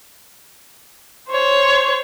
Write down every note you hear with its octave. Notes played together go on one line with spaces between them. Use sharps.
C5 C#5